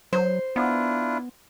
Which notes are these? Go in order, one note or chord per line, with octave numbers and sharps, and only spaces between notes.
F#3 C5
B3 D4 E4 F4